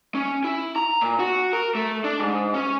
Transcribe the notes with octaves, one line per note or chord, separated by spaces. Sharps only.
C#4
E4
A#5
A#2
F#4
A#4
A3
D4
G#2
C#4